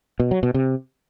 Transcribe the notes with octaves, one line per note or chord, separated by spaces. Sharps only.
B2
F#3
B2
C3